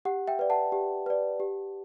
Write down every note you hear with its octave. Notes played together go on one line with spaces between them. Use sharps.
G4 F#5
E5 G5
B4 D5
F#5 A5
G4
B4 D5
G4